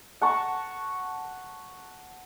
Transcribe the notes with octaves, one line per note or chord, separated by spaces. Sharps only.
F#5 A5 A#5 C#6